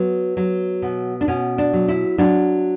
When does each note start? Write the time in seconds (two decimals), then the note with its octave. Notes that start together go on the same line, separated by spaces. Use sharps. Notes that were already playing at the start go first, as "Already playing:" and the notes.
Already playing: F#3 B3
0.37 F#3
0.82 B2
1.21 D4
1.28 B2 C#4
1.58 D4
1.73 F#3
1.88 E4
2.18 F#3 D4